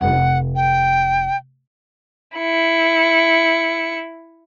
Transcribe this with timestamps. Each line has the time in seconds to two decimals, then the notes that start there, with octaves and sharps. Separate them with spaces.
0.01 F1 F#5
0.56 G5
2.38 E4 C#7